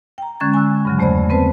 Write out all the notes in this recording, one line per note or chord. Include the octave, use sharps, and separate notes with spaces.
G5 A#5
D3 G#3 C#4 C#6 G#6 A6
G#5 C#6 E6 F#6
G2 C#3 F#3
E2 A3 C5 D5 B5
B3 C4 B4 C5 A5